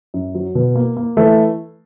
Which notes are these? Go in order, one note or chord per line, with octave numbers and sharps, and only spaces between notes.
F#2
F#3
B2
A#3
A#3
E3 A3 A4